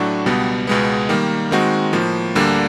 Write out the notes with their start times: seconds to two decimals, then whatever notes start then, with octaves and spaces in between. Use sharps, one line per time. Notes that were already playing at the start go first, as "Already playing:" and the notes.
Already playing: A2 F#3 A3 D4 F#4
0.26 C#2 B2 G3 B3
0.67 C#2 B2 G#3 B3
1.09 D#3 G3 A#3
1.51 D#3 G#3 C4 D#4 F#4
1.93 A2 F3 A#3
2.35 D2 D3 G3 A#3 D4